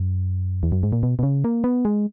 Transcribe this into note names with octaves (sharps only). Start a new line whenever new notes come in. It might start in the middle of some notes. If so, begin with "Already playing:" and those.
Already playing: F#2
E2
F#2
G#2
A#2
B2
B2
C#3
A#3
B3
G#3